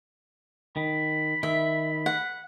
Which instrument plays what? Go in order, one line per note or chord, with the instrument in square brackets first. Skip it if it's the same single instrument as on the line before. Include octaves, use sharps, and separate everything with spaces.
[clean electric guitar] D#3 [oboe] B5
[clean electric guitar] D#3 [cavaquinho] E5
[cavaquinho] F#5